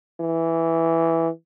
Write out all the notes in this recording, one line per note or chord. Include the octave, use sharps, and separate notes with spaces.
E3